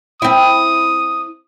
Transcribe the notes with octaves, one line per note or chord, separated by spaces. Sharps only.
C4 E4 D#6